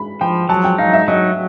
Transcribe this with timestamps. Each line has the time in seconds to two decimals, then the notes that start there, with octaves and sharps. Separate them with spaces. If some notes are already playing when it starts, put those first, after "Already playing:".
Already playing: B5
0.21 F3 G5
0.49 F#3 A5
0.64 G5
0.78 D#4 F5
0.93 E5
1.08 F#3 D#5